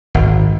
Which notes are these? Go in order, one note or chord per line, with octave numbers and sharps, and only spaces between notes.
G#1